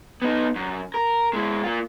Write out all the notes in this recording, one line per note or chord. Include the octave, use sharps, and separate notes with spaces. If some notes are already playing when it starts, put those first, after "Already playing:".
B3 D#4
F#2
A#4
G#3 E4
A#3 F4